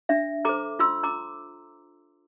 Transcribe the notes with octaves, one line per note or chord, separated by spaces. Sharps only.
D4 E5
A4 C5 A#5 D6
F4 C6 E6
A#5 D6